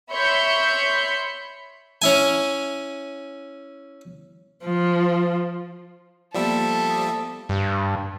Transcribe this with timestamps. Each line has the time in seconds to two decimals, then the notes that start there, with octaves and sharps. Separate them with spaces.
0.12 C#5 E5 B5 C6 G6 C#7
2.02 C#4 E4 G#5
4.65 F3
6.34 F3 G3 A#3 B3 A4 D5 E5
6.90 D#6
7.49 G2